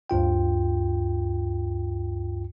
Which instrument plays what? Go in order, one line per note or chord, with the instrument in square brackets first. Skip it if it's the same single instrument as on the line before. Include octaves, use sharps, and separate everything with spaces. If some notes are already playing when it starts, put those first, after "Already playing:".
[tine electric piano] D2 G2 F4 G5